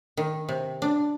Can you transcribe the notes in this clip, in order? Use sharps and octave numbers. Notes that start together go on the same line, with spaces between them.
D#3
C3
D4